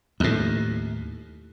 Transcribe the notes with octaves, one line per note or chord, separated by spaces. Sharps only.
D#2 A2